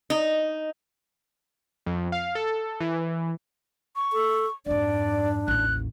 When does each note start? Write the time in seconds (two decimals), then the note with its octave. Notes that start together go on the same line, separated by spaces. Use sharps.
0.10 D#4
1.86 F2
2.12 F5
2.35 A4
2.81 E3
3.96 C#6
4.13 A4
4.66 F2 G#2 D4 D5
5.48 A1 D#2 F#6